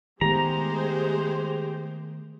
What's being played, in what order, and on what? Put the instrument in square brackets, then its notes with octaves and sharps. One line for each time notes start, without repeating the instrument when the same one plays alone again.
[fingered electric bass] D#3 A3 B3 [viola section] G#3 G#4 C5 [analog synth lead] G4 [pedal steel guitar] A#5